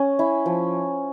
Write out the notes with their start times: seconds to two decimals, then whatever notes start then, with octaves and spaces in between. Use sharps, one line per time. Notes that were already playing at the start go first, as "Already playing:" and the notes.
Already playing: C#4
0.19 E4
0.46 F3